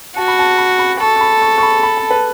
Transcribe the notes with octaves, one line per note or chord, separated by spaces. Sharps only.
F#4 A5
B5
A5
B5
B5
A4 C#6
C#6
B5
C#6
C#6
B5
B5
A5
B4